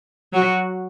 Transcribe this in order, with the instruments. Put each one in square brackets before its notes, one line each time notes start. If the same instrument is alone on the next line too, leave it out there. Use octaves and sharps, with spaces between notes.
[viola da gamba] F#3 F#4